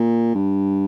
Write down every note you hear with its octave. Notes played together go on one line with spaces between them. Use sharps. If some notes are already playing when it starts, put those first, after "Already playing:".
Already playing: A#2
G2